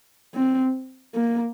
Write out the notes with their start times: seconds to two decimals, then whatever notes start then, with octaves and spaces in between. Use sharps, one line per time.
0.34 C4
1.14 A#3